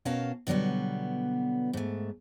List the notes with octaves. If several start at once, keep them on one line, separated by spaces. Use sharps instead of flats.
B2 C#4 A#4 F5 A5
B2 D3 F#3 G3 B3
G#2 A3